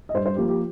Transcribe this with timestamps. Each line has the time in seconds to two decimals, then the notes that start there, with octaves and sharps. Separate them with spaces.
0.09 D#5
0.14 G2 C5
0.26 C5
0.36 F3 A#3 G4
0.49 G4